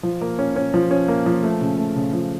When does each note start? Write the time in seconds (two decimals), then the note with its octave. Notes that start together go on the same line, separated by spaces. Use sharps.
0.03 F3
0.21 A#3
0.39 C#4
0.56 C#4
0.74 F3
0.91 C#4
1.08 A#3
1.26 F3
1.43 A3
1.61 C#3
1.78 A3
1.96 C#3
2.13 F3